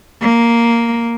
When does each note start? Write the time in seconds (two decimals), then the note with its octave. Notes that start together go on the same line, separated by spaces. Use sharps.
0.22 A#3